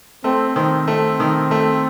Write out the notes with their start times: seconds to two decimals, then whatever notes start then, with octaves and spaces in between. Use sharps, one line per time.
0.24 A3 C4
0.56 D#3 C4
0.88 A3 C4
1.20 D#3
1.51 A3